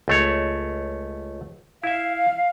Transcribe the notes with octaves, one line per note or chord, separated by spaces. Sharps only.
C#2 A3 C#5
E4 E5 F5